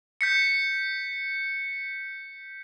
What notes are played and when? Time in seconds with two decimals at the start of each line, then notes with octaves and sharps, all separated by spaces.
0.21 G6 B6 C#7